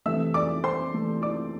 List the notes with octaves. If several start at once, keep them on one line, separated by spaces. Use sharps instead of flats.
C3 E3 A3 E5 E6
D5 D6
C5 C6
C3 E3 A3
D5 D6